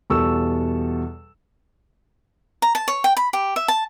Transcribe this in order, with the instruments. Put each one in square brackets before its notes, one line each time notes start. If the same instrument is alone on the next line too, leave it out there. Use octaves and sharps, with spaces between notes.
[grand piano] E2 B2 G3 A4 C#6 E6
[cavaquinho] A#5
A5
C#5
G5
B5
G4
E5
A5